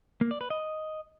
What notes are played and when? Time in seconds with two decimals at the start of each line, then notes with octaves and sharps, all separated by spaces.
0.21 A#3
0.31 D5
0.41 B4
0.50 D#5